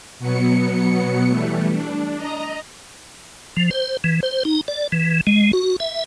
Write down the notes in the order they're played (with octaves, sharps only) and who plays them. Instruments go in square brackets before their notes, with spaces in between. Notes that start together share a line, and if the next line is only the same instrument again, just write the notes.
[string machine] B2 F#3 B3 C#7
E3 G3 A3
D4
D#5 A#5
[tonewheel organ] F3
C5
E3
C5
D#4
D5
E3
G#3
F#4
E5